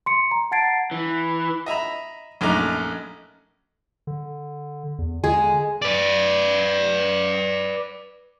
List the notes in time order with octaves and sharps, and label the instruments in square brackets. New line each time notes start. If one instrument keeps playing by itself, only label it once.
[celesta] C6 C#7
A#5
F#5 A5 G#6 A6 C7 D7
[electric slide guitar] E3
[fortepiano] D#5 E5 A#5 B5
A#1 F#2 A3 D#4 A#5 D6
[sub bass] D3
E2
[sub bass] D3 [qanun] G#3 G#4
[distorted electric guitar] B4 D5